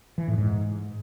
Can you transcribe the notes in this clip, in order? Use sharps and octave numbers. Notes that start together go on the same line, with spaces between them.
E3
A2
G#2